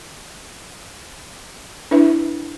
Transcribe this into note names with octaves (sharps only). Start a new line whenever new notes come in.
D4 E4 B4 E5